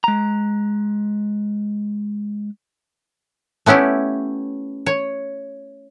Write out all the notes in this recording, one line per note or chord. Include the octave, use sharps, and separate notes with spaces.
G#3 A#5
A3 B3 C#4 E4 G4
C#5